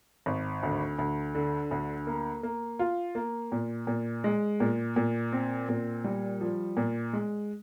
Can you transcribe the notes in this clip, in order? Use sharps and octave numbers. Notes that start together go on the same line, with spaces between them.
G#1
D2
D2
D3
D2
A#3
A#3
F4
A#3
A#2
A#2
G#3
A#2
A#2
C4
A#2
G3
F3
A#2
G#3